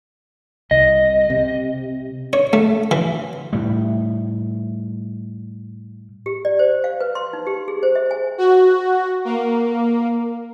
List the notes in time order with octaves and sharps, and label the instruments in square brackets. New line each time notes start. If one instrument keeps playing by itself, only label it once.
[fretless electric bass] C2 [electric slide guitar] D#5
[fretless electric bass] C3
[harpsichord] C#5
A3
E3
[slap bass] A2 G3
[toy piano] G4
D5
C5
F5
B4
C6
D#4
G4
G#4
C5
E5
G#5
[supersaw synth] F#4
A#3